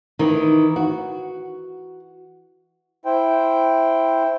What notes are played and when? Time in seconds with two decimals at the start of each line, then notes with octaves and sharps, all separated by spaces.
0.19 D#3 E3 D#4
0.76 F#4
3.05 E4 C5 G5